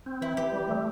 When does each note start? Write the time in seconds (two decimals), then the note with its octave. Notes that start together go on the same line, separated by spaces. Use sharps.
0.06 C4
0.21 E3 E4
0.37 E3 G4
0.53 G3
0.69 A3